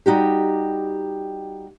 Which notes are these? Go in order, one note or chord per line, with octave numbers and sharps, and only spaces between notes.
G3 D#4 F#4 G4